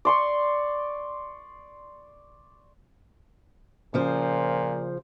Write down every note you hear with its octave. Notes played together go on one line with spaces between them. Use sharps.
D5 C6 C#6
A#2 C#3 F3 C5